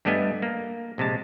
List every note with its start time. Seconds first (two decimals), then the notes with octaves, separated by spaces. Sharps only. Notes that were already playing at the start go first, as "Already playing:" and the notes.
0.05 G2 G3 A3 B3 D#5 G#5
0.42 A#3
0.98 A#1 C3 G#3 A5